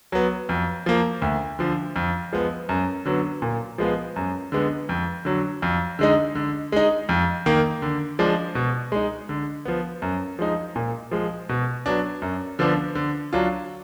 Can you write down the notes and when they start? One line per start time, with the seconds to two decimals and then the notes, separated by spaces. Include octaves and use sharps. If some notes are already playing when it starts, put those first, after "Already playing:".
0.12 F#3 B3
0.49 F2
0.86 F3 A#3
1.22 D2
1.59 D3 F3
1.96 F2
2.33 F3 G#3 B3
2.69 F#2
3.05 D3 F#3 B3
3.42 A#2
3.78 F3 G#3 B3 F4
4.16 F#2
4.52 D3 G#3 B3
4.89 F2
5.25 D3 F#3
5.62 F2
5.99 D3 G#3 D#4
6.35 D3
6.72 G#3 D#4
7.09 F2
7.46 D#3 A#3
7.82 D3
8.19 F3 G#3 D4
8.55 B2
8.92 G#3 D#4
9.29 D3
9.65 F3 B3
10.02 F#2
10.39 F3 G#3 D#4
10.76 A#2
11.11 F3 G#3
11.49 B2
11.86 F#3 B3 D4
12.22 F#2
12.59 D3 F3 B3 D4
12.95 D3
13.33 F#3 D4 F4